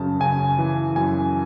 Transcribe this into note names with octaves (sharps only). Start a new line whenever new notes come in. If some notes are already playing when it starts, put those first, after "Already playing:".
Already playing: F#2 C#3 A5
C#3 G#5
E3
F#2 G#5